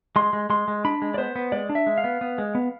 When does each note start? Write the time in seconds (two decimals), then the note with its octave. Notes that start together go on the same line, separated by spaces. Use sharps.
0.16 G#3 C6
0.33 G#3
0.50 G#3 C6
0.68 G#3
0.85 D4 B5
1.02 G#3
1.14 D5
1.18 B3 C5
1.36 B3
1.52 G#3 D5
1.69 D4
1.75 E5
1.87 G#3
1.98 F5
2.04 B3
2.21 B3
2.38 G#3
2.55 B3